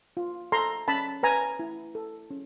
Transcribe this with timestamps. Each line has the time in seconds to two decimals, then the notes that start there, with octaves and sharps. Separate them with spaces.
0.17 F4
0.52 A4 A#5 C6
0.88 C#4 A5 B5
1.23 B4 G#5 A#5
1.59 E4
1.95 A4
2.30 C#4